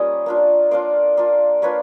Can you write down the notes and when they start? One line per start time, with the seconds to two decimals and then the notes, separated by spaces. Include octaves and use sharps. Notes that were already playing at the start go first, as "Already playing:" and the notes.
Already playing: G3 A#3 C#4 F4 C#5 D#5
0.26 A#3 D4 F4
0.71 A#3 D4 F4 C5 D5
1.17 A#3 D4 F4
1.62 A#3 D4 F4 B4 C#5